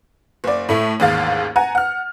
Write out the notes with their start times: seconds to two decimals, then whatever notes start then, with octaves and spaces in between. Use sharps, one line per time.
0.44 F#1 D5
0.69 A2 A3 E4
1.00 A1 D#2 G#2 F5 A6
1.56 F#5 G#5 A#5
1.75 F#5 F6